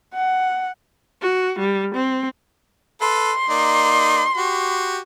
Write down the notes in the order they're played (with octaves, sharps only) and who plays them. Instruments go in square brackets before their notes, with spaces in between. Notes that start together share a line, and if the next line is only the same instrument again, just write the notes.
[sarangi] F#5
[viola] F#4
G3
C4
[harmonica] A4 B4 [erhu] C6
[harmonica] A#3 D#4 D5
F#4 G4